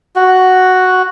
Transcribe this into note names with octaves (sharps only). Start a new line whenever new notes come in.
F#4